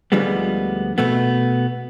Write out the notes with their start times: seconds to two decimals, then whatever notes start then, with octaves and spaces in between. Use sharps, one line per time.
0.12 D2 D3 F3 G3 G#3 B3
0.98 B2 A3 B3